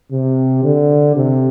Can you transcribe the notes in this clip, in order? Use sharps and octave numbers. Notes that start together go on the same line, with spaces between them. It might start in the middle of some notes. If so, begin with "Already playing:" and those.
C3
D3
C3